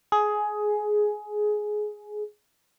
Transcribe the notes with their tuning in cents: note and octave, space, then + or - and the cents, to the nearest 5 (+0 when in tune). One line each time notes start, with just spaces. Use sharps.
G#4 +15